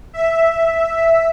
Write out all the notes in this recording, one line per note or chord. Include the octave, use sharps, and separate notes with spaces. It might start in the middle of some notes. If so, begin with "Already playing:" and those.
E5